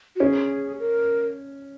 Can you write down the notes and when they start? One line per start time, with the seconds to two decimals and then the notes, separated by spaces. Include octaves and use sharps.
0.16 F#4
0.20 C#4 G#4
0.79 A#4